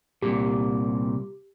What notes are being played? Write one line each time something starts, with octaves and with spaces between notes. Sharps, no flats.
C2 A#2 G4